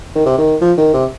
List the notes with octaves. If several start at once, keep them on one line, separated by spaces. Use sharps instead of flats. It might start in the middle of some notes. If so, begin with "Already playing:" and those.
D#3
C3
D#3
F3
D#3
C3